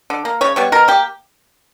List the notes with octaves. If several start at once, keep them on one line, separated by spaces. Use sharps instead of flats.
D3
A#3
C#3 C#5
G3 B3 C#5
B2 A#4
A#3 G4